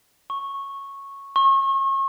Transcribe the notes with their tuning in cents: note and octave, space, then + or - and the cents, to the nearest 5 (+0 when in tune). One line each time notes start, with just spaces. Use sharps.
C#6 -10
C#6 -35